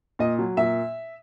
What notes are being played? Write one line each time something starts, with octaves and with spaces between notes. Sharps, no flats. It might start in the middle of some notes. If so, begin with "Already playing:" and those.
A#2 D#5
F#3
A#2 E5